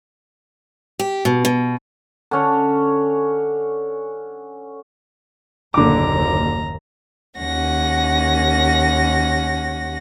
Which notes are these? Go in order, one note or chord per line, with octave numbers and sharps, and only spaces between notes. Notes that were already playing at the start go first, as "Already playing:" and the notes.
G4
B2
B2
D3 C#4 C#5
F#1 D#2 A#2 D3 A#5 D6
D#2 C#4 F#5 A#6